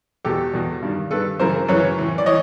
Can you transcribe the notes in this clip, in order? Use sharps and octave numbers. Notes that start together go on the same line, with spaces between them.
E2 B2 G4 A4
E2 B2
G2 D#3
G2 D#3 A4 B4
F#2 C#3 E3 A#4 C5
F#2 C#3 E3 B4 C#5
A2 E3
D5
E3 C#5 D#5